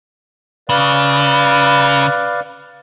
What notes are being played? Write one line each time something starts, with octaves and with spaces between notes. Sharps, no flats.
C#3 B4 D5 F5